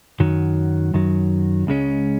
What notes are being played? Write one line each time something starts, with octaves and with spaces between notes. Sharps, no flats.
F#2 D#3 F#3
F#2 D#3 F#3
C#2 C#3 G#3 C#4